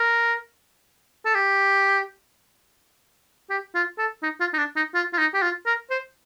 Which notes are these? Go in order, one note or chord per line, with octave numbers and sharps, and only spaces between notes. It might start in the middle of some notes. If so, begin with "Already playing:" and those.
Already playing: A#4
A4
G4
G4
F4
A4
D#4
F4
D#4
D4
D#4
F4
F4
D#4
G4
F4
A#4
C5